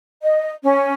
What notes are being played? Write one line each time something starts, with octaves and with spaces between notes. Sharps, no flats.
D#5
C#4